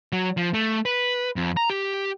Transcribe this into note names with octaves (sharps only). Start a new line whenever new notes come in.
F#3
F3
A3
B4
F2
A#5
G4